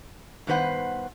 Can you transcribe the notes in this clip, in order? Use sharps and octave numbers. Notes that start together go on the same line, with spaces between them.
G2 D#3 B3 B4 C5 F#5